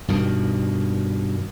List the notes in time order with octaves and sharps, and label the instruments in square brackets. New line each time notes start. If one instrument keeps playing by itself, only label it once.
[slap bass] G2 B2 D#3